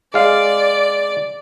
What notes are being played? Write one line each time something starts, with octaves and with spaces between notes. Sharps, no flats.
G#3 D5 F5